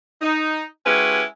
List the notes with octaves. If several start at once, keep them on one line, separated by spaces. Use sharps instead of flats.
D#4
G#3 C#4 E4 F#4 G4 B4